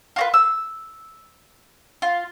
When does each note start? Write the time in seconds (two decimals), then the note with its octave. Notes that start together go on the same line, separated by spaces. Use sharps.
0.16 F4 F#4 B4
0.34 E6
2.02 F4